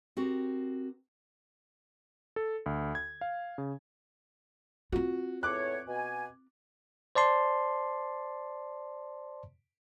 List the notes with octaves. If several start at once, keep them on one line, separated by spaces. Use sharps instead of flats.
C4 F#4 G4 A#4
A4
D2
G#6
F5
C#3
C4 F4 F#4
E2 A2 C#5 D6 F#6
B2 G#5
C5 D5 A5 C6